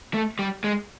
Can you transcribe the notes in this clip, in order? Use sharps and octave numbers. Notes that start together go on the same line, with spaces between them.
A3
G3
G#3